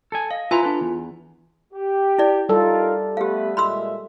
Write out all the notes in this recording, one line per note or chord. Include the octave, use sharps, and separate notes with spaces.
A4 G#5
D#5 F5
E4 F4 B4 G#5 A#5 C6
D4 A4 B4
E2
G4
E4 D5
G3 D#4 F4 A4 A#4
A3 B3 G4 B4 F5
A#2 G#3 E5 B5 C6 E6